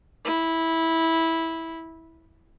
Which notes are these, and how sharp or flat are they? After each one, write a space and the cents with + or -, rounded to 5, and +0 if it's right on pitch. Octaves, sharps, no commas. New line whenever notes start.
E4 -15